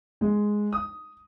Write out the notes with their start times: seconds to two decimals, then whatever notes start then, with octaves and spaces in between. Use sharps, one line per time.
0.21 G#3
0.73 D#6